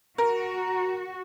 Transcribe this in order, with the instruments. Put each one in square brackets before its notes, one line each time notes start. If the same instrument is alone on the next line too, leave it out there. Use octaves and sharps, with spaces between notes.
[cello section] F#4 [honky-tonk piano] A#4